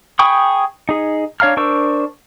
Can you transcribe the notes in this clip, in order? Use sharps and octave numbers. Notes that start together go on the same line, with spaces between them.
G#4 G5 B5 C#6 D#6
D#4 G#4
D4 C#5 F5 A#5 F6
D4 A#4 C5 C#6 E6